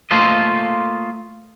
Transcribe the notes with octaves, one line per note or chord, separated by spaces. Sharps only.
A3 A#3 F4 A4 C5 D#5